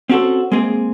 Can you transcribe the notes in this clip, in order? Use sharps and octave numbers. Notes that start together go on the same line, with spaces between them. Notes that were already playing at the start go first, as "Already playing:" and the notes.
C4 C#4 F#4 G4 A4 C5
G#3 A#3 C4 G#4